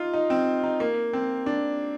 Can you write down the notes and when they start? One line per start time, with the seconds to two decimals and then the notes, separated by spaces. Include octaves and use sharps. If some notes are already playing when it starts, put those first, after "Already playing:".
Already playing: D#4 F4
0.13 D#4
0.30 C4
0.63 D#4
0.80 A#3
1.13 C4
1.46 D4